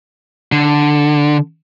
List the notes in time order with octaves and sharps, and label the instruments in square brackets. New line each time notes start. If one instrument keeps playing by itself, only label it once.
[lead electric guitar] D3